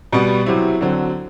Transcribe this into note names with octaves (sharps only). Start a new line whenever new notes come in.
B2 G3 B3
C3 F#3 C4 E4
D3 F#3 C4